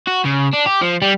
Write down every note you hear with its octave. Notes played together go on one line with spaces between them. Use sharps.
F#4
C#3
D4
G4
F3
G3